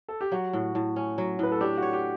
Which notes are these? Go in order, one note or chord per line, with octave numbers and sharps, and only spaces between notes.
A4
G4
F#3 F#4
A2
A2
C#4
F#3
A2 B4
A4
D4 G4
F#4 C#5
G4